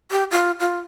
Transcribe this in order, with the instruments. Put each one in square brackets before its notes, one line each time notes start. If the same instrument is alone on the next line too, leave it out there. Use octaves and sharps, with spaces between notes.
[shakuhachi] G4
F4
F4